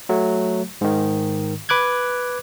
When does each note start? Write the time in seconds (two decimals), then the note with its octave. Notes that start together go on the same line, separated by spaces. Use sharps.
0.09 F#3 A3
0.81 G#2 D#3
1.69 B4 D6 F#6 G#6